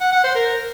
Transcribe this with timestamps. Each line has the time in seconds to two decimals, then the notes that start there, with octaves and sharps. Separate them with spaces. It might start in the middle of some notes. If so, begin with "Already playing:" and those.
0.01 F#5
0.12 F#5
0.24 C5
0.35 A#4